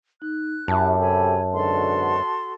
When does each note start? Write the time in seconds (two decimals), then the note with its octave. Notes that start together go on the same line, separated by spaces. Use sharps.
0.22 D#4 F#6
0.68 F#2 E4 F#4 G4 A5
0.98 C3 G4 A4 C#5 G#5 B5
1.53 G#2 B2 D3 F#4 A4 C6